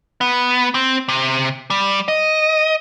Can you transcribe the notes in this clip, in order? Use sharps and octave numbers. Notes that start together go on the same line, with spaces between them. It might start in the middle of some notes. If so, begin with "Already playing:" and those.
B3
C4
C3
G3
D#5